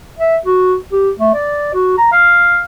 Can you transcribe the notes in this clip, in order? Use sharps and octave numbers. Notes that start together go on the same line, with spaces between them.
E5
F#4
G4
A3
D5
F#4
A#5
F5